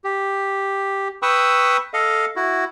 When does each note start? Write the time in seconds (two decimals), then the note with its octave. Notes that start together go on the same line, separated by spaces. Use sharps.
0.04 G4
1.22 B4 G5 B5 C#6 D#6 E6
1.94 A4 D#5 F5
2.36 E4 F#4